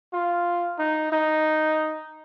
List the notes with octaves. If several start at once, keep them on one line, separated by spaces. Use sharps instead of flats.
F4
D#4
D#4